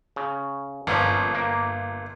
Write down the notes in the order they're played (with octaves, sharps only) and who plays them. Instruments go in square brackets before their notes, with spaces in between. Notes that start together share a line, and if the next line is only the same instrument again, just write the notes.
[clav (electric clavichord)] C#3
[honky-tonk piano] G1 [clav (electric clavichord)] A#2 F3 C#4
[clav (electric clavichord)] A#3